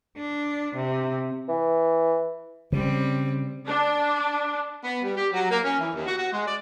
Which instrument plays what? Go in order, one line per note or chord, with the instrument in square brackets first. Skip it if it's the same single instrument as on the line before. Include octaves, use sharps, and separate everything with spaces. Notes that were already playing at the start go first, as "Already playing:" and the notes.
[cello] D4
C3
[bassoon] E3
[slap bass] C#3 [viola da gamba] G3 C4
[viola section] D4
[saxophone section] B3
G3
G4
F#3
A#3
C#4
E3
D#2
F#4
F#4
G#3
D5